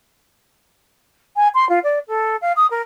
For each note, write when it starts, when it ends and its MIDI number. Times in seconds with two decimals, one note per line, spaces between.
1.36 1.48 80
1.54 1.67 84
1.69 1.78 65
1.83 1.98 74
2.07 2.36 69
2.41 2.52 77
2.56 2.66 87
2.70 2.81 70